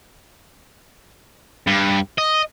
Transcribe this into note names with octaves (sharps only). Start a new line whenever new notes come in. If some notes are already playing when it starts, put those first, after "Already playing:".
G2
D#5